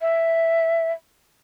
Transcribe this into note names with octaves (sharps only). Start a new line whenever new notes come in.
E5